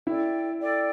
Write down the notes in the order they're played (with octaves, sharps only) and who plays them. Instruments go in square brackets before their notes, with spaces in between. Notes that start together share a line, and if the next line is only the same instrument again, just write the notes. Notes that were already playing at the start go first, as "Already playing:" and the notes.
[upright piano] E4 [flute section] A4 D5 G5
[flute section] A4 D5 G5